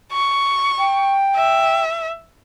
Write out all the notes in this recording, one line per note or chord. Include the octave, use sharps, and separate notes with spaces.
C#6
G5
E5